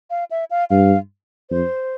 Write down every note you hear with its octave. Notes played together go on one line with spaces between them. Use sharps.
F5
E5
F5
G2 F5
F2 C5